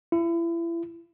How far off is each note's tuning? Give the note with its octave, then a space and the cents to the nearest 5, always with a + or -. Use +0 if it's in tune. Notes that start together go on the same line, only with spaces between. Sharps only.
E4 +35